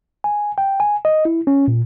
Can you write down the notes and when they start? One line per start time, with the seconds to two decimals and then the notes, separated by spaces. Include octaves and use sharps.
0.24 G#5
0.58 G5
0.80 G#5
1.05 D#5
1.25 E4
1.47 C#4
1.68 A#2